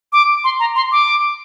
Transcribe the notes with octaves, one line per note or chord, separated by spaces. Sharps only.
D6
C6
A#5
C6
D6